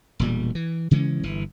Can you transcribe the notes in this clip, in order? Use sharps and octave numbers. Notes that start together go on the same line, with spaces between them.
E1 A#2 G3
E3
C#3 E3 G#3 C#4
G1 E3